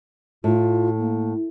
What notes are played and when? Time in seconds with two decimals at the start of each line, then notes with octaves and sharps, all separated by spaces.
0.44 A2 F4
0.97 A#3